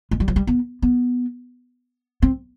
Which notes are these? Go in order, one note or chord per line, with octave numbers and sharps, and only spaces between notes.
G#3
G3
F3
G3
B3
B3
C4